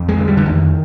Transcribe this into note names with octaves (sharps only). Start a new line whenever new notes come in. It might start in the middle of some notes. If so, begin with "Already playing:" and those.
Already playing: F2
G#3
D3
G3
D3
F2 D#3